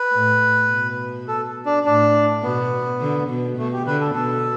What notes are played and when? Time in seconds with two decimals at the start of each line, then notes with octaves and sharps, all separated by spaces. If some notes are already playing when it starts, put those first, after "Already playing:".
Already playing: B4
0.13 A2
0.70 B2
1.28 A4
1.66 D4
1.85 A2 D4
2.42 B2 B3
3.00 D3
3.29 B2
3.58 B2 A3
3.73 G4
3.86 D3 B4
4.00 A4
4.15 B2 A4